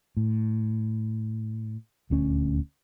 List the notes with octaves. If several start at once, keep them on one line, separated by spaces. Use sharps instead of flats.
A2
D#1 D2 C#4